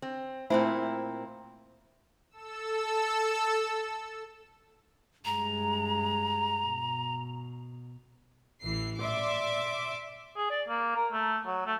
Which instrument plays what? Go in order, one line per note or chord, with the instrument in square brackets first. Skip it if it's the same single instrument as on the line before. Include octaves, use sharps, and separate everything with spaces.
[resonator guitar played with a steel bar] C4
[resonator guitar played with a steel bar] A#2 C4 E4 [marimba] A3 C5
[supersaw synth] A4 E6
[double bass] G2 G#3 [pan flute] A#5
[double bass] B2
[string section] A1 E3 C7
D5 E5 C6 D6
[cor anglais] G#4
D5
A#3
A#4
A3
F#3
A3